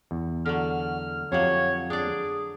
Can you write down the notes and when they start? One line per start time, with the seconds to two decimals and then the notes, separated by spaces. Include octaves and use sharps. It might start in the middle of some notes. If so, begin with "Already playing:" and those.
0.11 E2
0.46 D3 F#3 F6
1.32 F2 F#3 G4 C5 C#5 F5
1.90 D4 G#4 D5